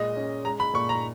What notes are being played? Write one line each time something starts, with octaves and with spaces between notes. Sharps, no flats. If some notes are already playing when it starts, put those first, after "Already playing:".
Already playing: A#2 G#3 D#5
C#4
G#3 A#5
B5
A#2 C#6
A#5